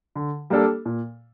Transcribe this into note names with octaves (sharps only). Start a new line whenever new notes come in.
D3
G3 A#3 D4 A4
A#2